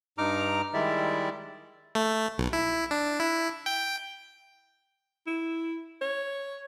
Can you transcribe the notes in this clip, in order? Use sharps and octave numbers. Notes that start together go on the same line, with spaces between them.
G2 D#4 A#5 D6 F6
D#3 G3 G#3 E4 D5 E5
A3
B1
E4
D4
E4
G5
E4
C#5